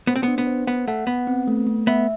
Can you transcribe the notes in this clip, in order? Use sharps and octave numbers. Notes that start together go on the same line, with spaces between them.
B3 C5
C4
B3 D4
B3
C5
B3 F#5
A3 F#5
B3 F#5
C4
A3
A3
B3 E5